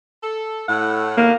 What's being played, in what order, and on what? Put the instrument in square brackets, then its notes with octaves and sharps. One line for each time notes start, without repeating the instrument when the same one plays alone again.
[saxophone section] A4
[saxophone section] A2 [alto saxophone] F#5
[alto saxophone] A#3